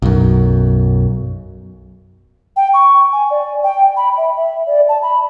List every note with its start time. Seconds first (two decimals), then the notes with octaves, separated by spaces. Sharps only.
0.02 B1 F#2
2.56 G5
2.74 C#6
3.12 G#5
3.30 D5
3.63 G5
3.97 B5
4.17 E5
4.37 E5
4.67 D5
4.89 A5
5.02 B5